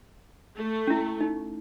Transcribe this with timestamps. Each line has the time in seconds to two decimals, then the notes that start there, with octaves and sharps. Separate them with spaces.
0.57 A3
0.87 C#4 E4
1.21 D#4